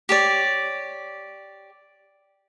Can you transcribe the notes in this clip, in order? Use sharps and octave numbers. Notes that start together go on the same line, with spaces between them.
G4 C#5 D5